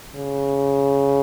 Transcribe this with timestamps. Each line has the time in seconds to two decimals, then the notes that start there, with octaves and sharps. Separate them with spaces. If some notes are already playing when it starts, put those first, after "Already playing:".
0.16 C#3